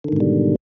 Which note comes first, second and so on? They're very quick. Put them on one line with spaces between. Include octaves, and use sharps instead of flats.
D3 D#3 G#2 B2 G3